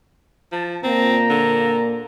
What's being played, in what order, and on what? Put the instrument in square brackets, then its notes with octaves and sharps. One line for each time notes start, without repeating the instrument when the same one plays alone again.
[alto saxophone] F3 [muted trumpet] A5
[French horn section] A#2 A#3 [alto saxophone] C4 [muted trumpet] A#5
[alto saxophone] D3